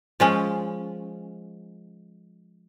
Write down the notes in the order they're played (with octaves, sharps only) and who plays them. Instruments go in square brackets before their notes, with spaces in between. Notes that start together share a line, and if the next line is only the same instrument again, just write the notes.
[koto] F3 G#3 C#4